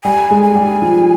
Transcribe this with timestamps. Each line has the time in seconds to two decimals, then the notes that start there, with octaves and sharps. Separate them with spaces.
0.04 G3 G#5
0.31 G#3
0.43 G#5
0.55 G3
0.82 F3